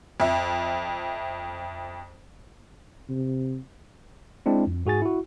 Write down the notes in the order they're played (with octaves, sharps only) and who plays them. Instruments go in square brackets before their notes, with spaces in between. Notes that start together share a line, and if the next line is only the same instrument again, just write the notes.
[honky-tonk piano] F2 E5
[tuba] C3
[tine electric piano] G#3 C4 D4 E4
F2
G#2 F#4 G#4 G#5 A6
E4 F#4